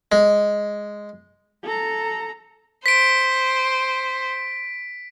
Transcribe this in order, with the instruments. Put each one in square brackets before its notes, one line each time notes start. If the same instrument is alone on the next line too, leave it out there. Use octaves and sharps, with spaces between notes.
[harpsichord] G#3
[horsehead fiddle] A4 A#5
[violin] C5 [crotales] B6 D7